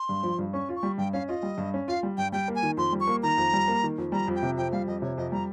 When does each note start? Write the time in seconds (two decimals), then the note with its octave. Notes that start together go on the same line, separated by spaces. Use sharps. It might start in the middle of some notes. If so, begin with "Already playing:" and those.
Already playing: C6
0.09 G2
0.23 F3
0.39 G2
0.53 C#4 C#6
0.69 F4
0.76 C#6
0.83 G3
0.98 G2 G5
1.13 C#4 F5
1.28 F4 D#5
1.43 G3
1.58 G2
1.74 C#4
1.88 F4 F5
2.03 G3
2.17 G2 G5
2.32 G3 G5
2.48 A#3
2.55 G#5
2.63 D#3
2.77 F2 C6
2.92 G3
3.00 C#6
3.07 A#3
3.23 D#3 A#5
3.38 F2
3.53 G3
3.68 A#3
3.83 D#3
3.98 F2
4.12 G3 A#5
4.28 F2
4.35 G5
4.43 C3
4.57 F2 G5
4.72 G3 F5
4.87 F2 D#5
5.02 C3 C#5
5.17 F2 D#5
5.32 G3 A#5